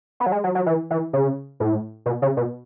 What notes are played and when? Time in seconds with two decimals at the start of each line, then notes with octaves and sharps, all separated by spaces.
0.20 B3
0.26 F#3
0.32 G#3
0.44 F#3
0.55 F#3
0.66 E3
0.90 E3
1.13 C#3
1.60 A2
2.06 B2
2.22 C#3
2.37 B2